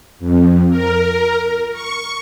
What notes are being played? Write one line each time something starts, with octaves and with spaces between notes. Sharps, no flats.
F2
A#4
C#6